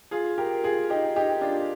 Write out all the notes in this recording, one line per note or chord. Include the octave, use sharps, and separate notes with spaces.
F4 G#4
G4 A#4
F4 G#4
D#4 G4
D#4 G4
D4 F4